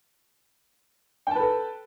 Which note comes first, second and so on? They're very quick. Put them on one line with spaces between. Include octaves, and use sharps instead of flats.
G5 A5 B4 A4